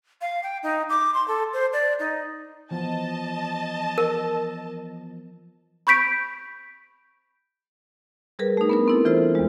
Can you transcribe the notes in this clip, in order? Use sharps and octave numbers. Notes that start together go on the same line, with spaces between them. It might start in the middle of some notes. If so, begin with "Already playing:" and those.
F5
G5
D#4
D6
C6
A4
C5
D5
D#4
E3 F3 B3 D#5 A5
A#4
B5 C#6 G6 B6 D7
G3 G#4 A#4 B4
A3 D#4
B3 D4 A#4
C4 E4 A4
E3 F4 A4 C5
E2 G#3